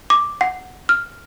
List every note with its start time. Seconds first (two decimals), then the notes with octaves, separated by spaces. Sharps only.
0.10 D6
0.41 F#5
0.89 F6